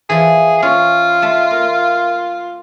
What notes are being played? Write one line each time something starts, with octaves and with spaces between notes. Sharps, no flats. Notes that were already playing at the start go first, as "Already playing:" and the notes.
E3 F3 G#4
C#4 F4
A3 A4 E5
A#3